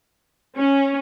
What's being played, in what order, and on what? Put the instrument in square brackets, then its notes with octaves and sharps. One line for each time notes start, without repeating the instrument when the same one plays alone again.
[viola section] C#4